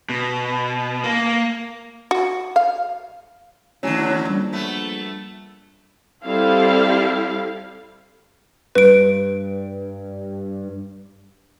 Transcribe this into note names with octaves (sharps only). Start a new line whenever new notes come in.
B2
A#3
F#4
F5
A1 D#2 D3 F#3 C#5 G#5
C#5
A#1 G3
A3 B3
G3 C4 E4 A4 F5
G2 B4 D7